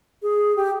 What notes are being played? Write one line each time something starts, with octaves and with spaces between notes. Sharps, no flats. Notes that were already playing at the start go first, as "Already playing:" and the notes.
G#4
G4